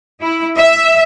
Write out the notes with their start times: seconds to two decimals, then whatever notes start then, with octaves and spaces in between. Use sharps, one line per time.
0.22 E4
0.57 E5